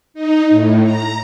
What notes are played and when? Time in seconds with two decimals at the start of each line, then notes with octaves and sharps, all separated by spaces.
0.14 D#4
0.50 A2
0.83 A#5